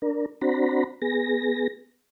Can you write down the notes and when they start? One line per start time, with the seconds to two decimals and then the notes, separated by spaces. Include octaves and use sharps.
0.02 D4 A#4
0.41 C4 D4 F#4 C5 A#5 B5
1.02 B3 G#4 A#6